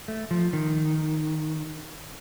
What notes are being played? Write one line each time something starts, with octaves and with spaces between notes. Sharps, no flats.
A3
F3
D#3